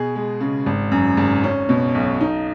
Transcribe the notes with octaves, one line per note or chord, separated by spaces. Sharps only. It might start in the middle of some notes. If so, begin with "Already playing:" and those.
Already playing: B2 G#4
G#3
C#3
G#1
F#2
G#1
C#4
B2
B1
D#4